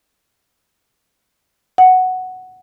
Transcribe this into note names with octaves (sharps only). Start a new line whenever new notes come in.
F#5